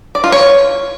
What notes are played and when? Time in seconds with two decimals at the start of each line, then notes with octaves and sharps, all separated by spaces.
0.15 D5
0.24 F4
0.32 C#5